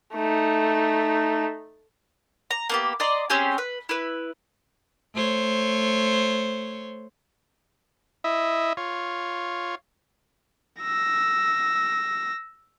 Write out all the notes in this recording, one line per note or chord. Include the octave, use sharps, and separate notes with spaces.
A3 D#4
A#5
A#3 B3 G4
D5 D#5 A#5 C6
C4 C#4 G4 G#4
B4
E4 B4
A3 C5 C#5
E4 D#5 E5
F4 C#5
E6 A#6